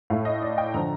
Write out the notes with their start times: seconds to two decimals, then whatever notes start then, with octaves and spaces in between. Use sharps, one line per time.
0.10 A2 A3 F5
0.25 D#5
0.42 D5
0.58 G5
0.74 D3 F3 A#5